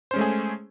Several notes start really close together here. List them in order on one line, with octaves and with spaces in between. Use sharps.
C5 C#4 G#3 A3 G#4